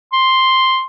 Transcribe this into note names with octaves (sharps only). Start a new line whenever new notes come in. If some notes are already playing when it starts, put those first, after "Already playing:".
C6